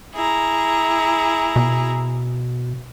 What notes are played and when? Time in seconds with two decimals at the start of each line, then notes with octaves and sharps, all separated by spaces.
0.14 E4 G#4 A#5
1.56 B2